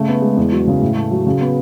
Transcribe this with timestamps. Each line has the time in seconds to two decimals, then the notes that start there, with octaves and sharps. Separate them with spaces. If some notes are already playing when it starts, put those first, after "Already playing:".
Already playing: C#3 A3
0.08 B3
0.22 G#3
0.37 E2
0.52 F#3
0.67 C#3
0.81 A2
0.97 A3
1.11 F#3
1.26 C#3
1.41 B3